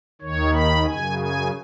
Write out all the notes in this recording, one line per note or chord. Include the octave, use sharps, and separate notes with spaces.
D#2 D#3 C#5
B5
F#2 C#3 G#5
G#5